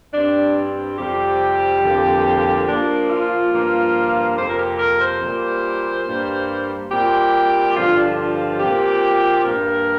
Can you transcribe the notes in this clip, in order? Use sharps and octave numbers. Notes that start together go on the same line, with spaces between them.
G2 G3 C4 D4
F2 C3 G3 C4 G4
F2 D3 F3 A#3
A#2 F3 A#3 D4
F4
G2 F3 A#3
F2 C3 A#3 C5
A#4
G4
A#4
C5
A#2 G3 A#3
G2 G3 A#3
A#2 G3 C4 G4
G2 D3 F3 F4
D4
F4
F4
A#2 F3 C4 G4
G2 G3 A#3 A#4